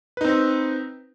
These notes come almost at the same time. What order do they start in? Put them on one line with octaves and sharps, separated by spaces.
B4 D#4 C4